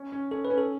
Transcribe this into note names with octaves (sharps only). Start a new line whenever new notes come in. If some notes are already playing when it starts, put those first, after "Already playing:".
Already playing: C#4
C#4
C#4 A4
B4
C#4
A4